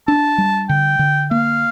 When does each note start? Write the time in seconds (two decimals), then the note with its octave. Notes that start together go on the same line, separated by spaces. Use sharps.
0.08 D4 A5
0.38 G3
0.69 D3 G5
0.99 D3
1.31 A#3 F5